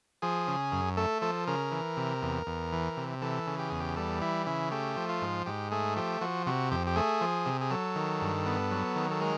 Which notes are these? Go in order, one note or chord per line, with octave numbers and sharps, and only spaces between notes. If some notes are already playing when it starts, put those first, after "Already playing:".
F3 G#4
C#3
F#2
A3 A4
F3 A4
C#3 A#4
E3
C3
E2
E2
E3
C3
E3 A4
C#3
G4
E2 G#4
G4
G3 A4
E3 E4
C#3 E4
A3 G4
F3
F4
G#2
G#2 G4
A3 G#4
F3 G4
F3 F#4
C3 F#4
F2 G4
G4
A3 G#4
F3
C3
G#4
F#3 A4
D#3
G2
B3
F#3
D#3
A4
G#3 A#4